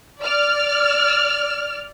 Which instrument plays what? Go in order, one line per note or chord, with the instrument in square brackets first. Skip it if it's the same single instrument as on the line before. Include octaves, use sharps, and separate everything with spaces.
[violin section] D5 F6